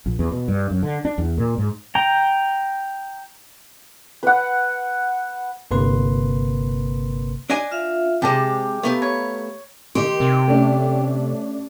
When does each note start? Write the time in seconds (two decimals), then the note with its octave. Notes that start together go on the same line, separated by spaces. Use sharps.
0.06 A#1
0.19 E2
0.32 B2
0.48 G2
0.71 F#2
0.83 D3
1.05 D4
1.18 E2
1.38 A#2
1.58 G#2
1.95 G5 A#5
4.23 B4 F#5
5.71 G1 C3 A#3 B4 C6
7.50 D4 D#5 G#5
7.71 F4 E5 F5
8.22 C3 G#3 G4 C5 A5
8.83 A3 B3 G4 F5 A#5 B5
9.02 C#5
9.95 D#3 G4 D#5 C6
10.20 C3
10.47 A3 C#4 D4